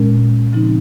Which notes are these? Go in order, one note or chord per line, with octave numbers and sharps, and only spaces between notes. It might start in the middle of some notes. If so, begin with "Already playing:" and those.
Already playing: A#2 G#3 C#4 A#4
C#3 F3 C4 D#4